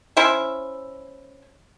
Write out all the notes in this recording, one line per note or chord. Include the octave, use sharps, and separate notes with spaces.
C#4 E4 C5 E5